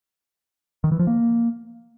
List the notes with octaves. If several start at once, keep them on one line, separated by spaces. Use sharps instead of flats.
D#3
E3
F3
A#3